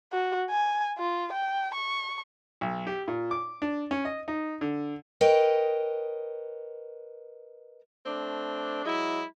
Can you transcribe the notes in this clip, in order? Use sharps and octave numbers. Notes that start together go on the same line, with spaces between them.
F#4
G#5
F4
G5
C#6
B1
G4
A#2
D6
D4
C#4
D#5
D#4
D3
A#4 B4 C#5 D#5 G5
A3 C4 D4
F#3 G#3 E4